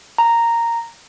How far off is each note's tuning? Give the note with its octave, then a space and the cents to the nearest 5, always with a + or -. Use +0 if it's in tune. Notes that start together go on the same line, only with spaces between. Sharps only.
A#5 -5